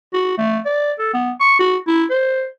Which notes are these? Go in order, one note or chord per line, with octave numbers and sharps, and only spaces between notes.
F#4
A3
D5
A4
B3
C#6
F#4
E4
C5